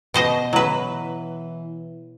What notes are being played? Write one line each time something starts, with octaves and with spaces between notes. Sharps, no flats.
B2 C5 D#5
E3 F#3 B4